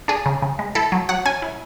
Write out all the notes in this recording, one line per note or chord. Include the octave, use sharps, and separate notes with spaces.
D4 G#4
C#3
C#3
G#3
E4 A4
F#3
F#3 F#5
C#4 G#5
E4